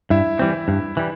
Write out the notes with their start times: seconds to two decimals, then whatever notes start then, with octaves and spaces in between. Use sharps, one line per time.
0.10 G2 E4 E5
0.39 E3 G3 C4
0.68 G2
0.97 E3 G3